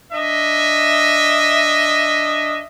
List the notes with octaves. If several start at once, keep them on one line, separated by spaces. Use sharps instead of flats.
D4 D#5 E5